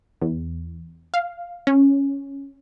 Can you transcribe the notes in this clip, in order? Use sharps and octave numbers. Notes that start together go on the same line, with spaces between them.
E2
F5
C#4